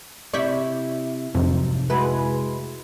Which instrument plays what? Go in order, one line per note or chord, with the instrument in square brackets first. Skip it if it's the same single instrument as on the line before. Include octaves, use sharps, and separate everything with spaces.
[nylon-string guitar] C3 [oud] E4 D5 [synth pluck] C#6 G6 B6
[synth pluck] A#1 F2 [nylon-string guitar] G#2 F3 F#3 [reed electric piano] C3
[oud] G#3 E4 B4 [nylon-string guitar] F#4